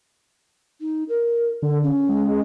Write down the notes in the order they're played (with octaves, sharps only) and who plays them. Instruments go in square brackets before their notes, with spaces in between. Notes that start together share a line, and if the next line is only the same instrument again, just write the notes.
[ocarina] D#4
A#4
[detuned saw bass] D3 [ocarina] A4
[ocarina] C#4
[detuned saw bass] G#3